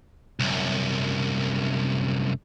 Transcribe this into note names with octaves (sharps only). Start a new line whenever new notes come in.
C2 F#2